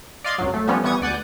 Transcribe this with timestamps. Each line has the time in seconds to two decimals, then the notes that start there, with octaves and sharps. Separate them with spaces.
0.24 D5 D#5 F5 C6 F6 G#6
0.38 C#2 F#2 F#3
0.54 A3
0.68 F3 G3 B3 C#4
0.84 E3 G3 B3 C#6 D#6 G#6
1.01 D2 D5 F#5 G#5 G6